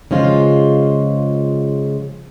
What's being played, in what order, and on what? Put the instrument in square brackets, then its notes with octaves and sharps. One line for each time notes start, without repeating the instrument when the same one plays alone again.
[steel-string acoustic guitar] C#3 F3 G#3 F4